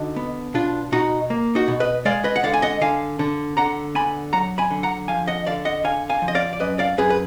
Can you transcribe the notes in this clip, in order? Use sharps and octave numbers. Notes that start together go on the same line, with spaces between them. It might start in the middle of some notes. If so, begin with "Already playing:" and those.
Already playing: D3 D#4 F#4
B3
B2 D4 F4
B2 D#4 F#4
A#3
D#4 F#4
B2
B4 D#5
G#3 D5 F5
B4 D#5
F#5
D3 D5 F5
G#5
D#5 F#5
D3 F5 G#5
D3
D3 F#5 A#5
B3 G#5 B5
F#3 F#5 A#5
G#5 B5
D3
F#5 A#5
F3 F5 G#5
D#5 F#5
D3 D5 F5
D#5 F#5
D3 F5 G#5
F5 G#5
F3
D#5
D5 F5
D5
F#2 B4 D#5
D5 F5
F#2 G#4 B4
B4